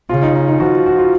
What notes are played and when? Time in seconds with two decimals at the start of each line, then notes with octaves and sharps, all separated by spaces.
0.09 C#3 F4
0.23 D#4
0.35 D#4
0.48 D#4
0.60 F3 F#4
0.86 F#4
0.98 F4